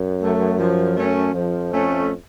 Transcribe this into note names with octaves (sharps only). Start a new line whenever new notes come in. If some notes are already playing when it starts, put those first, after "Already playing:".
Already playing: F#2
F#3 A3
F3
A3 C#4
F2 F3
A3 C#4